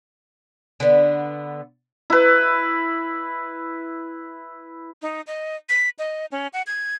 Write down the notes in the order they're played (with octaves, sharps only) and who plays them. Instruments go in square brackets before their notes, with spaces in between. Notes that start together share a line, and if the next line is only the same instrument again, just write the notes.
[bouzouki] D3 B3
[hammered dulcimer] E4 B4
[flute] D#4
D#5
B6
D#5
C#4
F#5
G#6